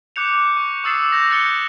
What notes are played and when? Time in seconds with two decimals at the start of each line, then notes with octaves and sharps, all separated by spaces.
0.16 D6 F#6 G6 C#7 F7
0.57 C#6
0.84 C#6 D#6 E6 A6 C7 E7
1.12 G6 A#6
1.30 F#6 A6 C#7 G7